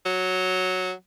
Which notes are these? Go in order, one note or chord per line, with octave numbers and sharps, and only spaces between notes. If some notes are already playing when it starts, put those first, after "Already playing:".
F#3